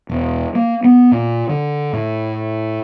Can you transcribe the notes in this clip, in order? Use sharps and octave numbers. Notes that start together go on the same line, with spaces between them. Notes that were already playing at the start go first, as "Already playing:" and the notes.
E1
A#3
B3
A#2
D3
A2